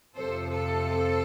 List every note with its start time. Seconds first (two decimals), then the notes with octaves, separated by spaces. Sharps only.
0.17 F2 C3 F3 A4 C5
0.50 A4 C5